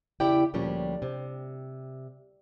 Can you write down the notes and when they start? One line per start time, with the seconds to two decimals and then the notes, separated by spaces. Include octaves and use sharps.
0.20 E2 C#3 E4 G4 D5 G5
0.54 D2 A#2 F3 G3 C#4 D4
1.02 C3